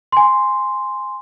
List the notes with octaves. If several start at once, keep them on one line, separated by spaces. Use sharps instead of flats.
G#5 C6